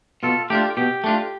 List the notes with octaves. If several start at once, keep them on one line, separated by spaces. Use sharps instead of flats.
B2 F4 A4
A3 D4 F4 G4
B2 G4
A3 D4 F4